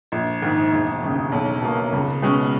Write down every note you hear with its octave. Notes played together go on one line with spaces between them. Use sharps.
A#1
G#2 D#3
E1
D#2 C#3
B1
B2 A#3
C#2
B2 G#3 C#4